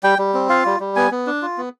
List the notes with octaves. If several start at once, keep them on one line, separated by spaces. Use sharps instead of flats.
G3 G5
G3
C4
F4 F5
G3
G3
B3 G#5
B3
D4
F4
B3